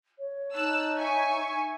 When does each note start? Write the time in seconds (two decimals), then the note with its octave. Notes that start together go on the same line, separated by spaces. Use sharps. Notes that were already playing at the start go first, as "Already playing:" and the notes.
0.19 C#5
0.55 D#4 A5 E6 F#6
0.97 E5 G#5 C#6